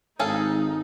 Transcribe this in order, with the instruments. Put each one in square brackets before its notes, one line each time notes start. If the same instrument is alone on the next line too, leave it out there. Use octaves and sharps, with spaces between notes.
[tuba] G#1 [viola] D#4 [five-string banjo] G#4 A4 F5